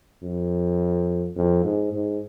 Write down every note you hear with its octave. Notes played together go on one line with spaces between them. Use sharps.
F2
F2
G#2
G#2